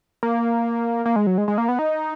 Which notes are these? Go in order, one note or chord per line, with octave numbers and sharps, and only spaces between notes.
A#3
A#3
G#3
F#3
G#3
G#3
A#3
B3
D#4